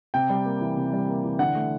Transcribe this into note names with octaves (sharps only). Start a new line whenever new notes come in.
C3 G5
G3
A#3
E3
C3
G3
A#3
E3
D3 F#5
A3